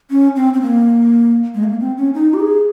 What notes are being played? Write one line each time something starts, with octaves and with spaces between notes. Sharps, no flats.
C#4
C4
C4
A#3
G#3
A#3
C4
C#4
D#4
G4
G#4